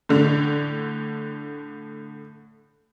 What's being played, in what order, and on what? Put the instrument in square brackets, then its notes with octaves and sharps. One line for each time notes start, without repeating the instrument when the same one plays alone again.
[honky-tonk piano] A2 D3